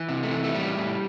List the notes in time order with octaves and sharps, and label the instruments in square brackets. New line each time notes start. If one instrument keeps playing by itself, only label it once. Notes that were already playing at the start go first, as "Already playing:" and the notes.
Already playing: [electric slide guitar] E3
C3
A3
E3
A3
A2 G3
A2